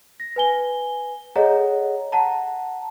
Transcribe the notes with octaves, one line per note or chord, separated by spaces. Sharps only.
A#6
B4 G#5 G7
G#4 A4 C#5 D#5 F#5 A#5
F#5 A5 A#5